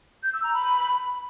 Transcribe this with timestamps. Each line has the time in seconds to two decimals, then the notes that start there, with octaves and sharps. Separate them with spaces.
0.23 G6
0.33 E6
0.44 A#5
0.54 B5